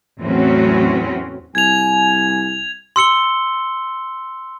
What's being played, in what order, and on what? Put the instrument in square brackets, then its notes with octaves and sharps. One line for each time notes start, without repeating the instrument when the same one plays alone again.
[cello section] E2 A2 F#3 C4 C#4 F#4
[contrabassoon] C2 [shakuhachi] G#5 [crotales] G#6 F7
[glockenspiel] C6 E6 C#7 G7